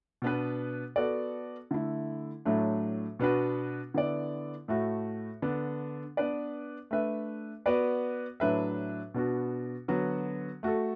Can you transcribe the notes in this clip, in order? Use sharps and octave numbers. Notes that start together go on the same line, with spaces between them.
B2 B3 D4 B4
B3 F#4 A4 D5
D3 A3 E4
A2 F#3 A3 D4
B2 B3 D4 F#4 B4
D3 B3 E4 D5
A2 A3 F#4
D3 B3 D4
B3 D4 B4 D5
A3 D4 B4 E5
B3 F#4 B4 D5
A2 F#3 D4 B4 E5
B2 B3 D4 F#4
D3 F#3 B3 F#4
A3 F#4 A4